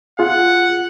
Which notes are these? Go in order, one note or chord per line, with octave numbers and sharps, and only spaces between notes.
F4 G#4 F#5